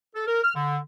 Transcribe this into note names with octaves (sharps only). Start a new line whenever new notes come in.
A4
A#4
F6
D3